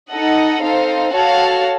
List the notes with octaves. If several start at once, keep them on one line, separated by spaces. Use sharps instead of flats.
D#4 A4 D#5 F#5
C4 D#4 A4 C5 F5
F#4 A4 C#5 F5 A5